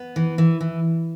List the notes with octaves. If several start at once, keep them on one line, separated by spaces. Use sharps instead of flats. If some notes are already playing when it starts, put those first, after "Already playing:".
Already playing: B3
E3
E3
E3